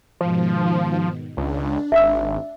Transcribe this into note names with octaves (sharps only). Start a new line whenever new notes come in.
G#2 B2 D#3 F3
C#2 D4
G#1 E5 E6